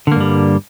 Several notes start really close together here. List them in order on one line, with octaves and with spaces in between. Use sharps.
D3 A#3 G2 G3